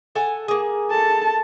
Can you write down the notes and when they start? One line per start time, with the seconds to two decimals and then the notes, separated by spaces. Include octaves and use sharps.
0.15 A4 F#5 G#5
0.48 A#3 G#4
0.90 A4 A5